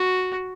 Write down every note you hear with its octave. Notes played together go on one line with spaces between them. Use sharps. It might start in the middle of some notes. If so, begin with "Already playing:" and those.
Already playing: F#4